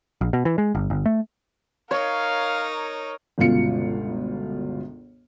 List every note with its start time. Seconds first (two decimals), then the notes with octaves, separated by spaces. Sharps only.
0.21 A#1
0.33 B2
0.45 E3
0.58 G#3
0.75 G1
0.90 G1
1.06 A3
1.91 D#4 A#4 C#5 F5
3.38 G1 C#2 B2 F4 C#7